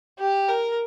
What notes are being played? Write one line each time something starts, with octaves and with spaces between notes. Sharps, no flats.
G4
A#4